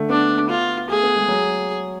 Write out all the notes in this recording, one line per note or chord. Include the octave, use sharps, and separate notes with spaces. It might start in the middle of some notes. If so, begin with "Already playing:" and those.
Already playing: D3 A3
B3 D4
F4
A3 G#4
B3
G#3
F#3